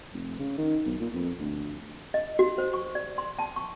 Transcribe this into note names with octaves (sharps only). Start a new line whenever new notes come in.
F1
C#3
D#3
B1
A#2
F2
D2
D#5
F#4
C5
C#6
D5
C6
A5
C#6